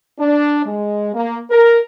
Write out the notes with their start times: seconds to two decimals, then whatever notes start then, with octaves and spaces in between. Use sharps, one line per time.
0.19 D4
0.66 G#3
1.14 A#3
1.51 A#4